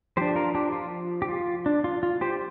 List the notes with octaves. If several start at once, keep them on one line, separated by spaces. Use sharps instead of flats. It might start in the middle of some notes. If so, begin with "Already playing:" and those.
F3 D4 G4 C5
F4 A#4
D4 G4
F4
G4
F4
D4
F4
F4
G4 C5